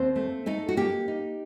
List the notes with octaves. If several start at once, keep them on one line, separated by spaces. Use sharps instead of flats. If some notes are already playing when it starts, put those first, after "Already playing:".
Already playing: D#2 C4 C5
A3
A3 D#4 A4
F#4
A#3 G4
D#4